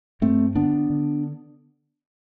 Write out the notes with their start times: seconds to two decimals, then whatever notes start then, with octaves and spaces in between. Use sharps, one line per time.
0.21 G2 A3 C4
0.55 D3 B3 D4
0.90 D3